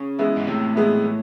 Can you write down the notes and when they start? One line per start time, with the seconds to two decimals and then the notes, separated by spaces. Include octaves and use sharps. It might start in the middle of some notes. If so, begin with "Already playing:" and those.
Already playing: C#3
0.19 E3 G#3 B3 E4
0.36 G#2
0.47 A2 C3
0.75 E3 G#3 B3 E4
1.02 E3